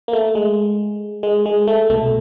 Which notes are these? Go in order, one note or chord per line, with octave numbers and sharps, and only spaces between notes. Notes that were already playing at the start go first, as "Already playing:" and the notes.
A#3
A3
G#3
G#3
G#3
A3
C2 B2 A3